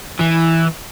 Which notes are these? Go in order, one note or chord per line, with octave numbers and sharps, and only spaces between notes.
E3